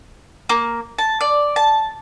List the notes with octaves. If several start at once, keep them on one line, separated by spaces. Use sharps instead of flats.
A#3
A5
D5
A5